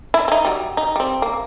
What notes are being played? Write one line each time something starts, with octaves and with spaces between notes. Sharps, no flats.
E4
C4 D#4
F#3 G3
D#4
G3 C4
A#3